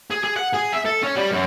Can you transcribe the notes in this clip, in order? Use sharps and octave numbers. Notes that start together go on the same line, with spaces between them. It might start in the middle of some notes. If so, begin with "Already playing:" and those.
G#4
G#4
F#5
G#4
E5
A4
C#4
G3
F#2